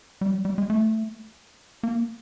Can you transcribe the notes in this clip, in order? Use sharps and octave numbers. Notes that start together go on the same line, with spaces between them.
G3
F#3
G3
G#3
A3
A#3